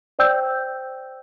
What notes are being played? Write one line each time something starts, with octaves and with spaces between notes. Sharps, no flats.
C5 D5 G5 E6 G6